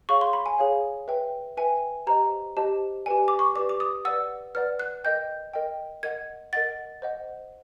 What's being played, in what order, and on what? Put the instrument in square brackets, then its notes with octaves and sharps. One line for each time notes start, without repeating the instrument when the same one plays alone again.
[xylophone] G#4 C#5 F5 C#6
C6
B5
G#5
G#4 C#5 F5
B4 E5 G5
B4 E5 G5 G#5
G4 C5 D#5 A#5
G4 C5 D#5 A5
G4 B4 D5 G#5
D6
C#6
G4 B4 D5 D6
D6
D#6
B4 D5 F#5 E6
B4 D5 F#5 F6
F#6
A#4 D#5 G5 G6
A#4 D#5 G5
A#4 D#5 F#5 G#6
A#4 D#5 F#5 A6
C5 D#5 F#5